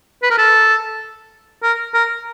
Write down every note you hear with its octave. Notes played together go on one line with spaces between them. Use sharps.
B4
A#4
A4
A#4
A#4